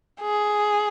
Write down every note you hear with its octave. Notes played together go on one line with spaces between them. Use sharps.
G#4